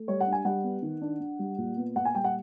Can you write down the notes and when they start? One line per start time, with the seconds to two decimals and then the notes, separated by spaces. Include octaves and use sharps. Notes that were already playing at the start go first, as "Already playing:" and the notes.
Already playing: A3
0.08 G3 C#5
0.20 F#5
0.27 D4
0.32 G#5
0.45 G3 F#5
0.64 B3
0.82 D#3
1.01 D4
1.20 D4
1.39 G3
1.58 A#2
1.77 B3
1.96 A#2 F#5
2.05 G#5
2.15 G3 G5
2.24 F#5